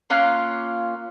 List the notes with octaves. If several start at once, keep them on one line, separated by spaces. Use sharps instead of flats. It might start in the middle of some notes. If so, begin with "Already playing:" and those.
A#3 C#4 F4 F#6